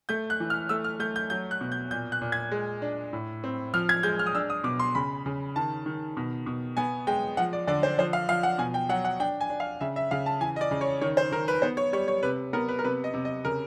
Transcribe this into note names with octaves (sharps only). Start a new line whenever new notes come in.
A3 G6
F#6
E3
F6
A3 E6
F6
A3 G6
G6
F#3 G6
F#6
B2
G6
A#2 G6
F#6
A#2
G#6
G#3
D4
A2
C4
F3 F6
G#6
G#3 G6
F6
D#6
D4 E6
D#6
B2 D6
C6
C#3 B5
C#3
D#3 A5
D#3
B2
B2
B3 G#5
G#3 G5
F3 F#5
D5
D3 D5
C5
F3 C5
F5
F3 F5
F#5
B2 G#5
G5
F#3 F#5
F#5
D4 G5
G#5
D4
F5
C#3 E5
E5
C#3 F5
A5
E3 G#5
D#5
D5
C#3
C#5
D#3 C#5
C5
D#3 A#4
B4
B3 C5
C#5
G3 C#5
C#5
C3 B4
B3 A#4
B4
A#4
C3 B4
D#5
C3
D#5
C#3 A#4